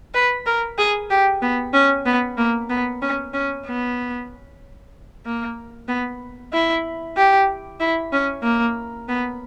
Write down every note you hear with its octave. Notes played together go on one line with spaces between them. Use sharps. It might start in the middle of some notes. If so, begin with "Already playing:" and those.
B4
A#4
G#4
G4
B3
C#4
B3
A#3
B3
C#4
C#4
B3
A#3
B3
E4
G4
E4
C#4
A#3
B3